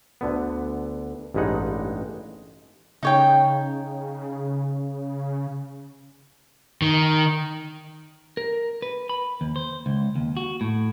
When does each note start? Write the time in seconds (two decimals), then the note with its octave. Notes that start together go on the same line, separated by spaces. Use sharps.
0.21 D2 D3 B3
1.34 A1 G2 G3 G#3 D#4 F#5
3.03 C#3 D#4 C#5 G5
6.82 D#3
8.37 A#4
8.82 B4
9.09 B5
9.41 D#2
9.56 C5
9.86 C#2
10.16 D#2
10.37 F#4
10.61 A2